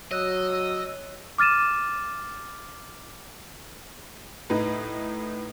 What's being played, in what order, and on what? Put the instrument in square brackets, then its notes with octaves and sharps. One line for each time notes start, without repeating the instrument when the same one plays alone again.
[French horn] F#3 [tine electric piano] C#5 F#6 [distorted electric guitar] D#5 [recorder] E6
[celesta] D6 F6 A6 D#7 E7
[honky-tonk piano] A2 D#4 B4